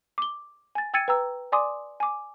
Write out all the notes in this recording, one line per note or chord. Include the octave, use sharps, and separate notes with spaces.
D6 G7
G#5 A6
G5 E6 G#6 A6 C#7 D#7
B4 G5 A#5 E6
D5 G#5 C6 D6 D#6
G#5 D6